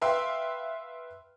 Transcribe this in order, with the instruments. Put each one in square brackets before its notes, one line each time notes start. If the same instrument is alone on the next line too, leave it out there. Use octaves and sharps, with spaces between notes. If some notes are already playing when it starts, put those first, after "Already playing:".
[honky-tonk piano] B4 E5 F5 G5 C6